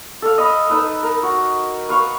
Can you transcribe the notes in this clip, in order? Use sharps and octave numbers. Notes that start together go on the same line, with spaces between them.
A4 F5
D#5 B5
D#4 B4 E6
A#4
F#4
B4 F5 C#6